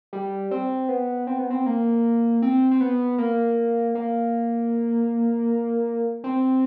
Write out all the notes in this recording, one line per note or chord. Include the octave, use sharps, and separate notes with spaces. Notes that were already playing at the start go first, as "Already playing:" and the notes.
G3
C4
B3
C4
B3
C4
A#3
C4
C4
B3
A#3
A#3
C4